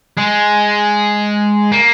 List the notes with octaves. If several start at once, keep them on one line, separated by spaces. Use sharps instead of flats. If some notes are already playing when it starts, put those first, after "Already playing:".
G#3
A#3